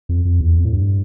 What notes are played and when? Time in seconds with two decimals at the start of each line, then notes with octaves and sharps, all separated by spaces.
0.09 F2
0.25 F2
0.40 E2
0.57 F2
0.65 A2
0.73 G2